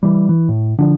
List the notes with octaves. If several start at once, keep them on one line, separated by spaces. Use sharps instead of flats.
E3 G3
E3
A2
D3 F3 D4